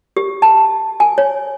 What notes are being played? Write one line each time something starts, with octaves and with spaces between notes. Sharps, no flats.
G4
A5
G#5
C#5